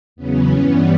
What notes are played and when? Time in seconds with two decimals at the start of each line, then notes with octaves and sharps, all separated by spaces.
0.16 E2 C#3 F#3 B3 C#4
0.50 G2 E3 G3